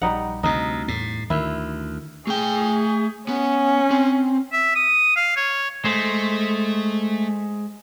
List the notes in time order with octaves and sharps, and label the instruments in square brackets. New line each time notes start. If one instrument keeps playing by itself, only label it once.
[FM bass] A#1 [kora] G3 D#4 F#5
[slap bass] D2 C3 [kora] D#4
[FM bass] E2 [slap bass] A2
[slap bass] D2 [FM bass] D#3 [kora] E4
[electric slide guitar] A3 G5 [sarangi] G#4
[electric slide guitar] B3 [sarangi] C#4
[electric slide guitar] C4
[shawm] E5
D#6
F5
C#5
[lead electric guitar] G#3 C5 [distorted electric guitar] A3